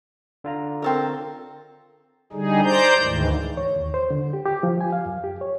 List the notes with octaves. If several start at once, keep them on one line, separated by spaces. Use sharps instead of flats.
D3 F4 A#5
C4 A4 A#4
D3 G3 D#4 G#4
C5 D5 A#5 G6
D2 G#2 D#3 E3
C#5
D#2
C5
D3
G4
G4
F3
G#5
F5
F#2
G4
C#5